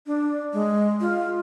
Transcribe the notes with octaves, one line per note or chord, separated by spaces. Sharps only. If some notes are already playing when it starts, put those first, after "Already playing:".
D4
G#3
F4